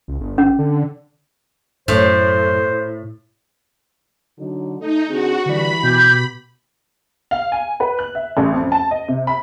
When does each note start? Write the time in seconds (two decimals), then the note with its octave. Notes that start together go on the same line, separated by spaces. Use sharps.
0.08 C#2
0.20 G1
0.38 C#4
0.58 D3
1.88 F#2 A2 C5
4.39 D3 F#3 D#4
4.80 A3 D#4
5.09 D3 C4 F#4 G#4
5.46 D3 E3 G3 B5
5.83 B2 G4 G6
7.31 F5
7.52 G#5
7.80 B4
7.99 F#6
8.15 E5
8.37 A1
8.53 F2
8.72 A5
8.91 D#5
9.08 C3
9.27 B5